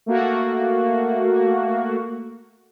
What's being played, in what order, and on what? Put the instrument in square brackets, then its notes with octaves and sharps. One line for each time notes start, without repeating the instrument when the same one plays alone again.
[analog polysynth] A3 A#3 F#4